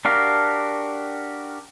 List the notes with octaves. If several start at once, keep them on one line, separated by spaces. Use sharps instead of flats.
D4 F#4 G4 A#4 F5